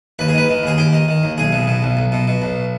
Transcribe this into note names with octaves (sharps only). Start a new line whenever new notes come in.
D#2 B4
G#4
D#3 B4
D#3
D#2 G#4
D#2 G4
D#3
D#3
D#2
B1 G#4
B2
B2
B1
B1
B2
B2
B1